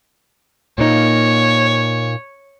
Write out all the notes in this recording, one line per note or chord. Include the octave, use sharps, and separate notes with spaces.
A#2 A#3 D#4 C#5